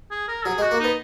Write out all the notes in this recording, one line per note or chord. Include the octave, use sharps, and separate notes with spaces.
G#4
A#4
F#3 G#4
G#3
F#4
A#3
B3 D#4